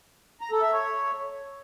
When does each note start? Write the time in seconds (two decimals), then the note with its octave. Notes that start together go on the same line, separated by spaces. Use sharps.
0.41 A#5
0.51 A4
0.62 E5
0.72 C#5